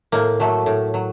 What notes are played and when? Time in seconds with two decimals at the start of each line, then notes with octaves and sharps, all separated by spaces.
0.12 A2 A#3
0.40 F#3 A3
0.66 A2
0.94 F#3